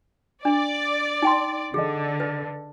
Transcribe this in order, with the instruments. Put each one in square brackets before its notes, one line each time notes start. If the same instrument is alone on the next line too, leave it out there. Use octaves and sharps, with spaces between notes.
[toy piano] D4 [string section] D5
[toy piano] D#4 G5 C6
[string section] D3 [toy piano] G#4 D#5
[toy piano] B4